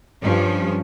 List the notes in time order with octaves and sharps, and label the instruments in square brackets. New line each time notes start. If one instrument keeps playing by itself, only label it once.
[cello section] G2 F3 C#4